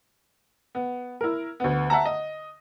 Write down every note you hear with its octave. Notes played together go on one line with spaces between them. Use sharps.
B3
E4 A#4
D2 B3
E5 F#5 A5 A#5
D#5